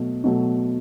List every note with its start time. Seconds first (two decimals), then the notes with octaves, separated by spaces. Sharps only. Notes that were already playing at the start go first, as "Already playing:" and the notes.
Already playing: B2 F#3 A3
0.24 B2 F#3 A3